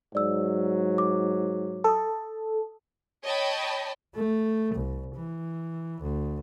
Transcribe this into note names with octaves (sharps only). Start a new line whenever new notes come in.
G#2 F#3 D5 E6
D6
A4 A5 D#6
C#5 D#5 G5 A5 B5
A3
C2
E3
D2